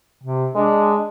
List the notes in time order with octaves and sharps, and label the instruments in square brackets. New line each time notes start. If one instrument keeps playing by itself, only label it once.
[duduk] C3
[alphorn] G#3 [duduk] D4